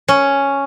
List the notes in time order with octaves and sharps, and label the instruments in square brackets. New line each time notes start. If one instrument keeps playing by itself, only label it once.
[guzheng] C#4